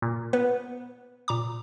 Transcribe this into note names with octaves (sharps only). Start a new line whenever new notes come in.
A#2
B3 B4
A#2 A#5 D6